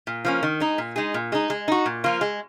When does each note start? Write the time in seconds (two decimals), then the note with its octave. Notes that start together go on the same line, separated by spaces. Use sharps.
0.07 A#2
0.25 F3 A#3 C#4
0.43 D#3
0.60 G#3 D#4
0.78 A#2
0.96 G#3 D#4 G#4
1.14 A#2
1.32 G#3 D#4
1.50 G#3
1.68 D#4 F#4
1.86 A#2
2.04 F3 A#3 F4
2.21 G#3